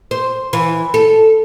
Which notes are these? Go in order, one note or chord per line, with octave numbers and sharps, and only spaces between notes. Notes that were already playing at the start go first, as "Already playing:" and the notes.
C5
E3
A4